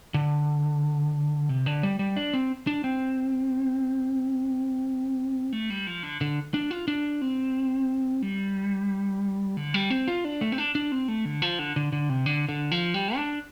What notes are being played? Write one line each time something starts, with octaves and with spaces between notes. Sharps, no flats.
D3
C3
D3
G3
G3
D4
C4
D4
C4
A3
G3
F3
D3
D3
D4
F4
D4
C4
G3
D3
G3
C4
F4
D4
A3
C4
D4
D4
C4
A3
D3
F3
D3
D3
D3
C3
D3
D3
F3
G3
D4